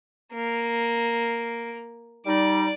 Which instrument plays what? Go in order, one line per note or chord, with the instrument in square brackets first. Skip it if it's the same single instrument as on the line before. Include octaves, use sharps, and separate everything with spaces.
[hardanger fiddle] A#3
[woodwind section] G3 D#4 [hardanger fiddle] D5